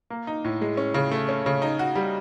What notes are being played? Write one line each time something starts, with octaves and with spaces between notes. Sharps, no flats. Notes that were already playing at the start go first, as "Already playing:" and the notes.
A#3
D#4
A2
G#3
C#4
C#3
A3
C#4
C#3
D#4
F#4
G3